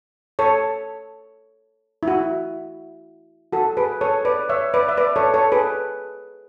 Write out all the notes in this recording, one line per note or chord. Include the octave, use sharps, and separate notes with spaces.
A4 C#5
E4
F#4
F#4 A4
G#4 B4
A4 C#5
B4 D5
C#5 E5
B4 D5
E5
B4 D5
A4 C#5
A4 C#5
G#4 B4